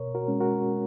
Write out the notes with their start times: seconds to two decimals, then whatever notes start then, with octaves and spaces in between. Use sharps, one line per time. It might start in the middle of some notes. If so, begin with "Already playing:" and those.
Already playing: B2 A#4 C#5
0.15 F#4 A#4
0.28 G#3 C#4
0.40 F#4 A#4